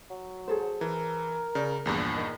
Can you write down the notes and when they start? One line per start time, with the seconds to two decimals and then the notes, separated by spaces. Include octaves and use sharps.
0.10 F#3
0.48 G#4 A4 C5
0.81 E3 A#4
1.55 C#3 D5
1.85 A#1 E2 G2
2.16 D#3